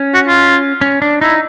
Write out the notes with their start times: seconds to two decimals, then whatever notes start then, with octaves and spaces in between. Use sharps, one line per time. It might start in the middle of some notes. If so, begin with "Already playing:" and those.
Already playing: C#4
0.14 F#4
0.28 F4
0.81 C#4
1.02 D4
1.21 D#4 E4